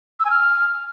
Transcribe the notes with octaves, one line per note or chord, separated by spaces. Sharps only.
E6
G#5
F6